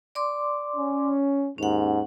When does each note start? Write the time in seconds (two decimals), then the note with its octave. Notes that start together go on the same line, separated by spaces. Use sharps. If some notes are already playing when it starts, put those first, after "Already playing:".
0.15 D5 C6 D6
0.76 C#4
1.58 D#2 G#2 C#4 F#5